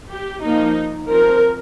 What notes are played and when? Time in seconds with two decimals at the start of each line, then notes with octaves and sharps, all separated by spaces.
0.10 G4
0.43 F3 A#3 D#4
1.10 F3 C4 A#4